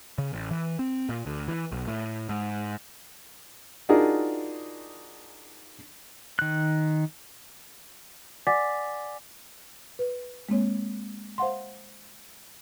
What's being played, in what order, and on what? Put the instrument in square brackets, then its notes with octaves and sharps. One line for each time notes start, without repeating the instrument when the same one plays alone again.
[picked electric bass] C#3
A1
E3
C4
A#2
D2
E3
B1
A2
G#2
[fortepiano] D4 D#4 F4 F#4 G#4 A#4
[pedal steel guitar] D#3 F#6
[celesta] D5 F#5 G#5 D6 A6 B6
[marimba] B4
G#3 A#3 C4 C#5
C5 F5 F#5 C6